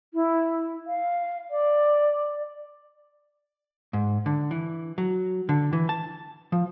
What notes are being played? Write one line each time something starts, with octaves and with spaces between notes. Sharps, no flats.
E4
F5
D5
G#2
D3
E3
F#3
D3
E3
A5
F3